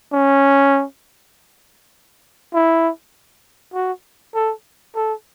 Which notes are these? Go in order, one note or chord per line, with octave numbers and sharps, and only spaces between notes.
C#4
E4
F#4
A4
A4